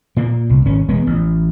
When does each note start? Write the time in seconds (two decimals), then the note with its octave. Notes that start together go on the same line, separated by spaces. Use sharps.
0.16 A#2 A#3
0.50 C2
0.66 G#1 C#4
0.89 E1 G#3 B3
1.07 A1